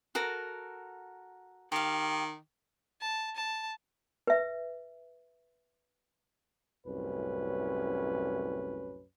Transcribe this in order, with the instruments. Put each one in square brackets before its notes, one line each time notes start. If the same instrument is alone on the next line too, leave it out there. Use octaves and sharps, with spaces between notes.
[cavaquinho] F#4 A4 A#4
[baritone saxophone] D#3 [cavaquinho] G4 F5
[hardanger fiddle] A5
A5
[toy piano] B4 E5
[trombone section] C2 F#2 A2 C#4 B4